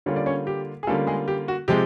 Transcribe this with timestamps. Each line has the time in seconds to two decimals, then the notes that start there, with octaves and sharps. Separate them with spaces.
0.06 D3 G3 A#3 C#4 F4 C#5
0.16 D5
0.26 C#4 C#5
0.47 G4
0.83 G#4
0.87 D3 G3 A3 A#3 C#4 F4 A4
1.07 G#3 G#4
1.28 G4
1.48 F#4
1.68 C3 F3 G#3 G4